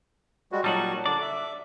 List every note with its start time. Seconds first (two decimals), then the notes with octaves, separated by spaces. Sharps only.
0.52 G3 G#3 F#4
0.64 A#2 F#3 G3 D#4 F#4 A5
1.06 D3 D4 D5
1.21 E5